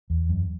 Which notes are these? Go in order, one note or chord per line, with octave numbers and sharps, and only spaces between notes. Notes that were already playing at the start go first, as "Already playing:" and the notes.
E2
F#2